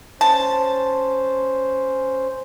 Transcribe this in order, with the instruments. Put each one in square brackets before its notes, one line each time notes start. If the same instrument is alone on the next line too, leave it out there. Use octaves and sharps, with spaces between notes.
[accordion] C#4 C5 [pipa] A5